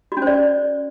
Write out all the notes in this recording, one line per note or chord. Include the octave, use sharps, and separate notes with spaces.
F#4
C#4
C5
D5